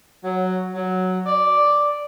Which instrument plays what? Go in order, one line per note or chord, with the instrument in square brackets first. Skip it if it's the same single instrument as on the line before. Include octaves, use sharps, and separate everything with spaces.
[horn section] F#3
F#3
D5